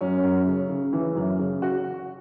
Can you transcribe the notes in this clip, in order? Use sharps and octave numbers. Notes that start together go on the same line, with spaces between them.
F#2 C#4
F#2
C#3
C#3
E3
F#2
C#3
F#4